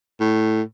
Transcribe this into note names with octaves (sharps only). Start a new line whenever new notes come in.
A2